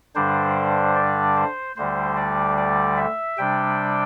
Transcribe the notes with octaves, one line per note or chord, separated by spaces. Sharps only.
G2 D3 G3 D4 C5
D5
C5
D2 D3 G3 C5
D5
D5
E5
C3 G3 D4 G5